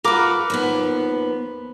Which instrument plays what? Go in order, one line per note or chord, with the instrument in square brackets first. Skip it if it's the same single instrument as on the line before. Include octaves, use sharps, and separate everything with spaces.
[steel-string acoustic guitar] F4 F#4 [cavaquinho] A#4 B4 D6
[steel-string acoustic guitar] D#2 F3 B3